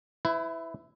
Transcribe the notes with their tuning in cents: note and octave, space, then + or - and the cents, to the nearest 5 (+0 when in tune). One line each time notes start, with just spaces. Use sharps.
E4 +0 B4 +35